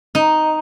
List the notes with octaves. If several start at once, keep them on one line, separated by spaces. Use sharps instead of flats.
D#4